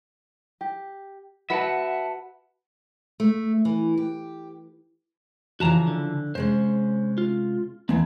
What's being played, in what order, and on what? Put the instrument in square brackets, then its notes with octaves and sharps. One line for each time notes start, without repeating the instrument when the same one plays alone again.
[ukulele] G4
[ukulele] F#4 B4 [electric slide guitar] E5 F#5 A5
[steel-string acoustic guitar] A3
E3
G4
[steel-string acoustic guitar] C#3 E3 F3 [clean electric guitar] F#4 A5 A#5
[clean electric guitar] D3
[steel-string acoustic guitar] C3 G#3 C#4 [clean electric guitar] C5
[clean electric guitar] F4
[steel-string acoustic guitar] D#2 E3 [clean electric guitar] A#3 C4